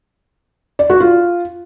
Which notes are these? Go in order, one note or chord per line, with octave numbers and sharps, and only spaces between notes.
D5
F#4
F4